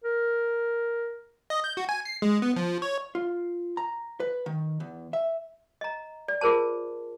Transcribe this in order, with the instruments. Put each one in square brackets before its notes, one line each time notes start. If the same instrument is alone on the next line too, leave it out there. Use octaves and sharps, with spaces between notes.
[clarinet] A#4
[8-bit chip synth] D#5
G6
F#4
G#5
C7
G#3
B3
F3
C#5
[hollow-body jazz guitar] F4
A#5
B4
D#3
E2
E5
[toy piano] D#5 A#5
D5
F4 G#4 A#4 C5 A5